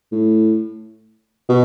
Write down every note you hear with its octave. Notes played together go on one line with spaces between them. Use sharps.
A2
B2